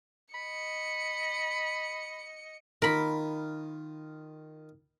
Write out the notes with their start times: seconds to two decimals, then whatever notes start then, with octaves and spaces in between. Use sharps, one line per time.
0.34 D#5 B5 C#7
2.82 D#3 F4 A#4 B5